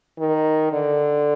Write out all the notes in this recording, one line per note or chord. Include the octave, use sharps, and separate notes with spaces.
D#3
D3